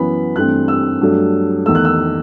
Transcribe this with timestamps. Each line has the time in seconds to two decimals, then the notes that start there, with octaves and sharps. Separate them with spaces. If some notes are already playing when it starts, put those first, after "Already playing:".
Already playing: F#2 E3 B3 B5
0.36 G2 E3 A3 C4 F#6
0.68 E6
1.01 G2 F#3 A3
1.66 E2 D#3 A3 E6
1.75 F#6
1.85 E6